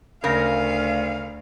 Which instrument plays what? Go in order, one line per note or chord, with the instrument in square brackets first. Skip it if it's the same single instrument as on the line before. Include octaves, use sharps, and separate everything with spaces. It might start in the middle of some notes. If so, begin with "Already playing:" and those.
[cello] D2 [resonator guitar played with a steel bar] C#3 A#4 [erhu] F5